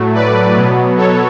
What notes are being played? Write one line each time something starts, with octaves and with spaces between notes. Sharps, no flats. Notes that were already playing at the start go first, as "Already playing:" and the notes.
Already playing: A2 F#3 A3
B4 D5
B2 F#3 B3
A4 C#5